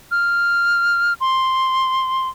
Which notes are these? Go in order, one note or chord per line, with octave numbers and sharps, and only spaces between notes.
F6
C6